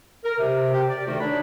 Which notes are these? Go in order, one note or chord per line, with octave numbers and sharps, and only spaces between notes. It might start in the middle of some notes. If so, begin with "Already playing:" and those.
A#4
C3
G4
D5
D2 D#3 A3 D#4 F#4
D4 D#4 C#5 B5